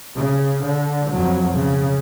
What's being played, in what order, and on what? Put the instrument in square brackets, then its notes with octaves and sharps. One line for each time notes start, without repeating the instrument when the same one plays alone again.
[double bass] C#3
D3
F2 F#3
C#3